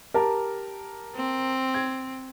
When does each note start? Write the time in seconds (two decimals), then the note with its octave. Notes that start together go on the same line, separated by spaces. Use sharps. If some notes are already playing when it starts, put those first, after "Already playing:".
0.14 G4 A#4 A5
1.15 C4
1.74 G#6